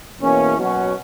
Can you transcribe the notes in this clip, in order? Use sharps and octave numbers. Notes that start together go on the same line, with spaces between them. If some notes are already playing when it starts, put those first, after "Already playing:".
E2 B2 A#3 C#4 E4
B2 F#3 C#4 F#4